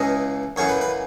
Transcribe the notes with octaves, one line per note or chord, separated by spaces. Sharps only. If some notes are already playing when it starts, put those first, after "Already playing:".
Already playing: C#2 C#3 E3 D#5
F#2 C#3 E3 C#5
B4
B4